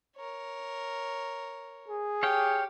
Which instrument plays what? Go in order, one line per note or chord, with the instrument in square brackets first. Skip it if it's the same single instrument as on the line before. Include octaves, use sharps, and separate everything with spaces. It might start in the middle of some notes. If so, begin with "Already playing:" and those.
[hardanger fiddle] A#4 C#5
[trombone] G#4
[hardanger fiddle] G4 [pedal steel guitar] C#5 F5 G5